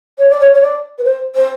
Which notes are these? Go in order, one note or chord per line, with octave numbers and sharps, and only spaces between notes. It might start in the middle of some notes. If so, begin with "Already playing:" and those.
C#5
D5
C#5
C#5
D5
B4
C5
C5